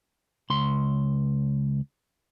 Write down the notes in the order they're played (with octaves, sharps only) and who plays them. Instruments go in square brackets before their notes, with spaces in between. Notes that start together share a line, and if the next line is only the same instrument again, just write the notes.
[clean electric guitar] C#2 C6